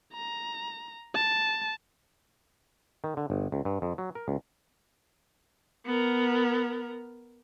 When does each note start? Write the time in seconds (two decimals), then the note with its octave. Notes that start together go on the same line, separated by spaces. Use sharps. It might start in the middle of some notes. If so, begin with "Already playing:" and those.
0.14 A#5
1.15 A5
3.04 D#3
3.17 D3
3.30 G1
3.52 C#2
3.65 G2
3.82 F2
3.98 F#3
4.15 A#4
4.28 C#2
5.86 B3 A#4